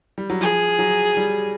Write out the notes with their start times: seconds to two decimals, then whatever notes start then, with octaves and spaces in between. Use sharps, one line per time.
0.18 G3
0.30 F#3
0.41 F3 G#4
0.79 F#3
1.17 G3